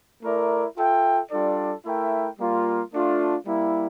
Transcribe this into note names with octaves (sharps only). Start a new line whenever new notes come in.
A3 E4 A#4 D5
F4 A4 E5 G5
G3 D4 F4 A4 D5
A3 E4 A#4 E5 G5
G3 A#3 F4
A3 D4 F4
G3 A#3 E4